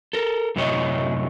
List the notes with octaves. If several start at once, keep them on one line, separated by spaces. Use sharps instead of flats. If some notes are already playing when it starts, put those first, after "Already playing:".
A4 A#4
F#2 A2 C3 E4 C#5 D#5